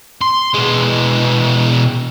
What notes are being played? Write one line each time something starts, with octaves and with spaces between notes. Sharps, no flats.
C6
B2 G#3